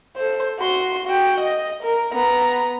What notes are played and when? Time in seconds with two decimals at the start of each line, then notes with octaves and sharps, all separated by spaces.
0.17 A4 C5
0.59 F#4 C6
1.06 F#4 G5
1.40 D#5
1.83 A#4
2.13 B3 A#5